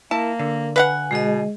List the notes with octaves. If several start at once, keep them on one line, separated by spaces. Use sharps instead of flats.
A#3 E4 A#4 A5
D3
B4 F5 F#5 G#5
B2 G#3 G#4 D#5